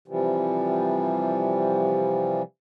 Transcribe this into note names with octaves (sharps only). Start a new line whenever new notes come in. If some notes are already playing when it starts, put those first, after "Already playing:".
C3 E3 F3 G3